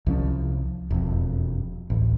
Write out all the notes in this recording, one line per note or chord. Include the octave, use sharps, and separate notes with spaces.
C2 F3 C#4
E1 F2
D1 A1